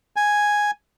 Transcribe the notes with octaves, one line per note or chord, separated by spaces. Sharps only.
G#5